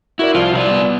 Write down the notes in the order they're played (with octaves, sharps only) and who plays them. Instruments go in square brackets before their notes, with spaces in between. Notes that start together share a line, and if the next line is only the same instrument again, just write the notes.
[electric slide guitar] E4 [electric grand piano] F#4 A#4 D5
[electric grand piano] C2 F3 [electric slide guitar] F4
[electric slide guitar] C3 A#4 D5
[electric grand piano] G3 B3